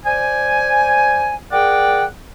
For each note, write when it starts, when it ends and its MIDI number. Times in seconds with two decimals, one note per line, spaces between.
0.05 1.35 72
0.05 1.35 74
0.05 1.35 80
1.52 2.04 68
1.52 2.04 70
1.52 2.04 74
1.52 2.04 78
1.52 2.04 79